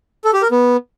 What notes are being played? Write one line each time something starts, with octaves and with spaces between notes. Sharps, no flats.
A4
G4
A#4
B3